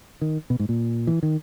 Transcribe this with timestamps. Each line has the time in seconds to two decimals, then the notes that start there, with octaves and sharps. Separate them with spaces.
0.21 D#3
0.50 B2
0.59 G#2
0.69 A#2
1.07 E3
1.23 D#3